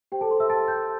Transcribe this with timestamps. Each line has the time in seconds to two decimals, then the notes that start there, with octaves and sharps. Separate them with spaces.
0.12 G4 C5 G5
0.21 A4 A5
0.30 C5 C6
0.40 E5 E6
0.49 A5 A6
0.68 G5 G6